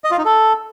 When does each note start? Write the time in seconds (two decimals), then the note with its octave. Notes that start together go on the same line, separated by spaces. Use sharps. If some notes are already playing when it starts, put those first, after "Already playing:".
0.04 D#5
0.11 F4
0.18 D#4
0.25 A4